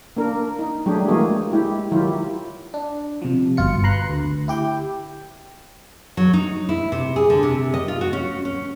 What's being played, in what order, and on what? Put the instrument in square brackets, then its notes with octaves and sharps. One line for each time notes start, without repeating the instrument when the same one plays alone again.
[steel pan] A#3 D4 A#4
D#4
F#3 G3 A3 D4 G4 G#4
E3 G#3 A#3 F#4 G#4
G#3 E4 G4
D#3 F#3 E4 F4 G4
[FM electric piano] D4
C3 F3
G1 B2 F4 C#7
B4 A#5 C6 F#6
D2
E4 G4 G5
[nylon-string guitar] F#3
D#4
E4
C3
G#4
D3
C3
D#5
F4
F#4
C#4
C#4